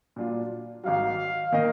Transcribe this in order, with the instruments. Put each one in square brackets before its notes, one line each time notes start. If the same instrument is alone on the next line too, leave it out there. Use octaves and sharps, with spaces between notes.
[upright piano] A#2 F#3 D4 F4
[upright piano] G#1 G#2 F#3 [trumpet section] F5
[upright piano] D#3 A#3 D#4 A#4 D#5